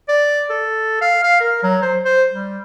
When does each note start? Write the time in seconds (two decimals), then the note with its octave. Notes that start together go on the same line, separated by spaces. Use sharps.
0.08 D5
0.50 A4
1.02 F5
1.24 F5
1.40 A#4
1.63 F#3
1.82 C5
2.05 C5
2.32 G3